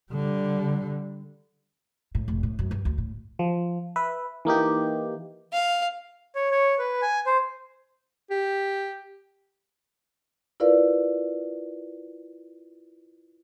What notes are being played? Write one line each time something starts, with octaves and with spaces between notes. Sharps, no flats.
D3 G3
A2
F1
A2
F#2
G2
D2
A2
F3
B4 E5
E3 A#3 D#4 G4
F5
C#5
C#5
B4
G#5
C5
G4
E4 F4 A#4 B4 D5 F5